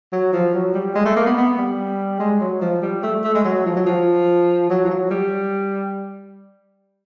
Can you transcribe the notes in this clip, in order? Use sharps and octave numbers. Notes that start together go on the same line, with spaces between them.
F#3
F3
F#3
G3
G#3
A3
A#3
B3
B3
G3
G#3
F#3
F3
G3
A3
A3
G#3
F#3
F3
F#3
F3
F#3
F3
F#3
G3